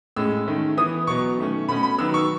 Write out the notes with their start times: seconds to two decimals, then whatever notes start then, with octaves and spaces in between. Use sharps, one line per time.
0.16 A2 G#3 C#4 E6
0.47 D#3 A3 C#4
0.77 E3 B3 D#6
1.07 B2 F#3 B3 C#6
1.38 D#3 A3 C#4
1.68 B2 A3 C#4 B5
1.83 B5
1.98 D#3 F#3 B3 E6
2.14 C#6